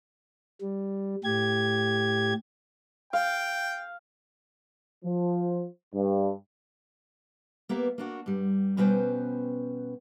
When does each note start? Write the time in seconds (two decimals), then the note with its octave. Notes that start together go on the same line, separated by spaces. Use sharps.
0.61 G3
1.24 A2 G4 G#6
3.13 F5 G5
5.04 F3
5.94 G2
7.69 A#3 B3 G4 E5
7.98 A#3 D4 F#4
8.26 G2 G3
8.77 B2 G3 C#4 B4 C5 G5